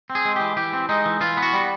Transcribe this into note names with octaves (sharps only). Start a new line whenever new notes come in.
C4
G#4
G#3
E3 G4
E3 G4
C4
G#3 D#4
E3
E3 F4
B3
F#4
G3